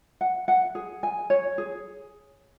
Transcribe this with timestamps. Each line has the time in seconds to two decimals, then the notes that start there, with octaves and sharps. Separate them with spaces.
0.21 F#5
0.48 F#5
0.75 G#4
1.03 G#5
1.30 C#5
1.58 G#4